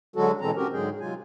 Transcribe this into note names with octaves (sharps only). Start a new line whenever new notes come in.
D3 F#3 G#3 F#4 A4
B2 E3 G#3 C4 A4 A#5
C4 C#4 F#4 G4 A#4
G#2 D3 F#3 G#3 G#4 G5
C3 F#3 G#3 F4 G#5